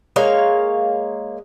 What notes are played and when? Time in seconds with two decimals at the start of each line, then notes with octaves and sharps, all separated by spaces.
0.16 G#3 A#3 C#5 F5